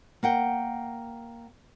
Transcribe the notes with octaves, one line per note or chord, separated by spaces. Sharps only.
A#3 F#5 G5